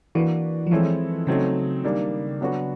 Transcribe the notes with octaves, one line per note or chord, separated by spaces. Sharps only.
E3 A#3 D4 F#4 B4 D5
F3
E3 G#3 C4 E4 A4 C#5
C#3 F#3 A3 C4 D#4
D#3 G3 A#3 D4
F#3 B3 D4 F#4